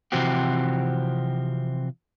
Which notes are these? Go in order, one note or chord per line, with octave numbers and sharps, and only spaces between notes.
C3 E3 F3 C4 F#4 G4